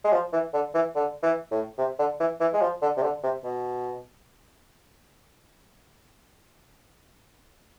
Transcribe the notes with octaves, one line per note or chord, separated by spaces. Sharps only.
G#3
F3
E3
D3
E3
D3
E3
A2
C3
D3
E3
E3
G#3
F3
D3
C3
D3
C3
B2